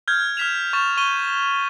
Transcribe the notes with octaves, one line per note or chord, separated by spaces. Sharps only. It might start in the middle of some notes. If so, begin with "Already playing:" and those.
F6 G6 G#6
F6 G#6 B6 E7 F7
C#6 A6 E7
C#6 D#7 G7